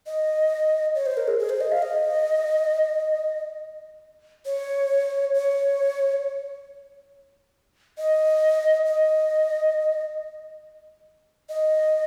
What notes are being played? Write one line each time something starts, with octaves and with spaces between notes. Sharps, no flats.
D#5
C#5
C5
A#4
G#4
G#4
C5
D#5
F5
D#5
C#5
C#5
D#5
D#5
D#5